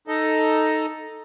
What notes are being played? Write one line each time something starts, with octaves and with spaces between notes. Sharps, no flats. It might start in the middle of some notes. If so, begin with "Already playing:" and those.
D#4 A4 D#5